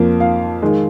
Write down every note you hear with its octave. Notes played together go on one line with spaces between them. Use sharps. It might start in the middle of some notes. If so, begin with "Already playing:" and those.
Already playing: F2 F3 A#3
F5
D#3 G#3